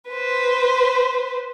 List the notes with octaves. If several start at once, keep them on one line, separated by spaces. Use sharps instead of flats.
B4 C5